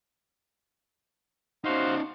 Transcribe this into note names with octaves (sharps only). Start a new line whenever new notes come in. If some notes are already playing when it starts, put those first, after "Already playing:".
C#4 D#4 F#4 C5 F5